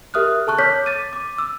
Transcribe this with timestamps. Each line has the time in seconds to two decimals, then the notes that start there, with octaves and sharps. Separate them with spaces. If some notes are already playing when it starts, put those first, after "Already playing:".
0.14 G4 A#4 E5 D#6 F6 F#6
0.47 A4 A5 C#6 F#6
0.58 C#5 D6 F6 G6 B6
0.86 D6 A6 D#7
1.13 D6
1.38 E6